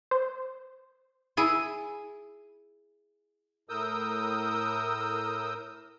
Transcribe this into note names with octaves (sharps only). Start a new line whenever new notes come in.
C5
E4 G#4 G#5
A2 A#4 D#6 E6 G6